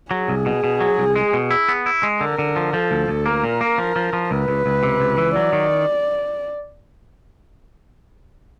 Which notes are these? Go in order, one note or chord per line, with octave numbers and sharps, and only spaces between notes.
F#3 G#4
C2
B2
B2
F#3
C2
G#3
B2
E4
B3
E4
G#3
D3 A#4
D3
F3
F3 A4
D2
D2
A#3 A#4
A#2
A#3
F3
F3
F3
C#2 B4
C#2
C#2
C3
C#2
E3
F#3 D5
D#3